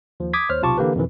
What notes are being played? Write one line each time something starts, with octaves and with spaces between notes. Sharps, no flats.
D#2 F3
D6 D#6 G#6 B6
D#2 C5 C#5 F6
B1 C3 F4 A5 C#6 D6
D3 E3 A#3 G4 B4
F2 B2 D#3 E3